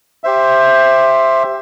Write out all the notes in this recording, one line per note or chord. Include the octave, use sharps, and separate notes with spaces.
G4 C5 E5